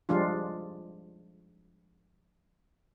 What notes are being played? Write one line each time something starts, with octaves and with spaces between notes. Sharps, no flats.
F3 G3 G#3 D4 F4